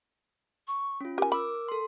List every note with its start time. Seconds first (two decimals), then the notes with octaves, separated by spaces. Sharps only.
0.68 C#6
1.01 C#4 F4
1.18 G4 A#4 G#5
1.32 B5 D6 E6
1.68 A4 C6